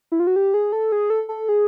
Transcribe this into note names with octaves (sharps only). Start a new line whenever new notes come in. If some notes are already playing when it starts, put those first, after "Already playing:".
E4
F4
F#4
G4
G#4
A4
G#4
A4
A4
G#4